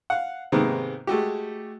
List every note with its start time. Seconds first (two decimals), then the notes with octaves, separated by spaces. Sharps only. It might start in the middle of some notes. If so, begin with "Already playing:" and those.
0.10 F5 F#5
0.52 G#2 C3 D#3 G#3 A#3 B3
1.07 G#3 A3 F#4 G4